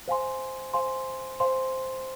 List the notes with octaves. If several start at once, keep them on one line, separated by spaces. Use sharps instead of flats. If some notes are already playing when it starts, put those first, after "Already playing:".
C5 F5 G#5 C6
C5 F5 G#5 C6
C5 F5 G#5 C6